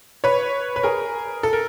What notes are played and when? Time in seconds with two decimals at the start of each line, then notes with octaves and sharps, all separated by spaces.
0.24 B4 C#5
0.76 B4
0.83 G#4 A#4
1.43 A4
1.53 A#4